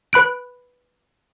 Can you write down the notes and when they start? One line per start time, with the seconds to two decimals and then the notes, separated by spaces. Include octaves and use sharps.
0.13 B4 B5 F#6 D7